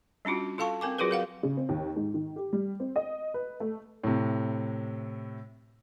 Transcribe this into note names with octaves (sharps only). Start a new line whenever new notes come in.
G3 C#4 D4 F4 F#4
F4 A4 F5 A5 C#6
C4 A#4 G#5 D6
F#3 F4 F#4 G#4 A#4 B4
A#4 F5 F#5
C#3
C4
D#2
G#2
D#3
G4
G3
C4
D#5
B4
A3
A2 C3